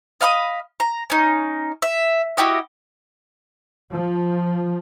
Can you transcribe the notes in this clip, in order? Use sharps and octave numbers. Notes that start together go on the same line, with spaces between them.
D#5 F5 B5 D#6
A#5
C#4 D#4
E5
E4 F#4 G4 D#5
F3